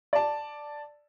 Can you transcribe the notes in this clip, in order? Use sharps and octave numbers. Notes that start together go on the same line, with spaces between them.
D5 A5